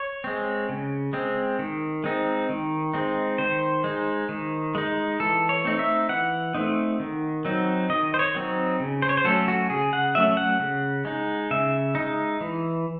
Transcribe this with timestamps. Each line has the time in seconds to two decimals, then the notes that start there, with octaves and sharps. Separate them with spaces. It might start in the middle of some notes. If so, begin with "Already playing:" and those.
Already playing: C#5
0.24 G#3 C4
0.69 C#3
1.13 G#3 C4
1.59 D#3
2.04 G#3 C4 D#4
2.49 D#3
2.94 G#3 C4 D#4
3.38 D#3 C5
3.84 G#3 D#4
4.29 D#3
4.75 G#3 D#4
5.20 E3 A4
5.49 C#5
5.65 A3 C4 D#4
5.79 E5
6.09 E3 F#5
6.54 A3 C4 D#4
7.00 D#3
7.45 F#3 C4 D#4
7.90 D#3 D#5
8.14 C5
8.19 C#5
8.35 F#3 C4 D#4
8.80 C#3
9.02 C5
9.09 C#5
9.17 C5
9.24 F#3 A3 C#4 A4
9.48 F#4
9.70 C#3 G#4
9.93 F#5
10.15 F#3 A3 C#4 E5
10.37 F#5
10.60 C#3
11.05 G#3 D#4
11.51 C#3 E5
11.95 G#3 D#4
12.41 E3